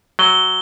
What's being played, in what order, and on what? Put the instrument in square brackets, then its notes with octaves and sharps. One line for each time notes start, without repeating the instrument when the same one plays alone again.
[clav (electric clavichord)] F#3 [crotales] G7